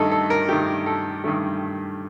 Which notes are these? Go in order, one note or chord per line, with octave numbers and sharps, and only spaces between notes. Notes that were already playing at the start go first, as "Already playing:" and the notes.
Already playing: G2 D#3 A3 D#4 A4
A4
A#4
G2 D#3 A3 G4
A4
G2 D#3 A3